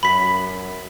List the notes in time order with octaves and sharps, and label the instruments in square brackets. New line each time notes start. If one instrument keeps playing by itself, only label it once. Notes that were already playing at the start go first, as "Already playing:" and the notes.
[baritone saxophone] F#2 [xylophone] B5 B6